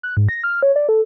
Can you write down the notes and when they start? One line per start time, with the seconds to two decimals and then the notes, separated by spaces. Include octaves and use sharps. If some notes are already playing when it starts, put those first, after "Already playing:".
0.03 F#6
0.17 G#2
0.29 A#6
0.44 F6
0.63 C#5
0.76 D5
0.89 A4